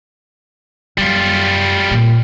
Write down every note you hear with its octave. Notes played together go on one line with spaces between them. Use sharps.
F#2 G3 F4
A#2